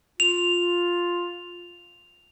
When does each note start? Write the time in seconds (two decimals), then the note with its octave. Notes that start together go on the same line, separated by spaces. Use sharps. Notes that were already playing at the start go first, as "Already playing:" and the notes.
0.20 F4 F7